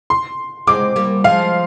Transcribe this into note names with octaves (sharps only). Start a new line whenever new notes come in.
C6
G#3 C4 D6
G3 A#3
F3 G#3 F5